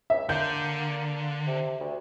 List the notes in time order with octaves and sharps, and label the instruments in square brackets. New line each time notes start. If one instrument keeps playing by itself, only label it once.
[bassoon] C#2 [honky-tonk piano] E5
[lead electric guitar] D3 [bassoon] A#3 [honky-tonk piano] G6
[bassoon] C3
D2